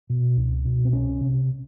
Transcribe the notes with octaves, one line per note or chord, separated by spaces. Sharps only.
B2
C#2
B2
C4
C2 C#4
C3